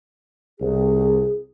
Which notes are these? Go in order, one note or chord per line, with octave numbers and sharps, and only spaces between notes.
C2 G#4